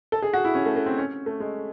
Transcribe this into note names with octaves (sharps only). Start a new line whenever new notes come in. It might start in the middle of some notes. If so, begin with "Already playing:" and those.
A4
G#4
F#4
E4
C#4
A3
A3
C4
C#4
A3
G#3